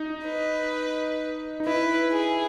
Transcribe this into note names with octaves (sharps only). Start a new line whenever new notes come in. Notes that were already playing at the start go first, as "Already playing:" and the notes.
Already playing: D#4
B4
D#4
E4 B4
G#4